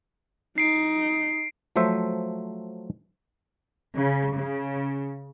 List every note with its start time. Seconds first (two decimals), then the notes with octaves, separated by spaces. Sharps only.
0.58 D#4 C7 D7
1.76 F3 F#3 A3 C5 E5
3.96 C#3
4.36 C#3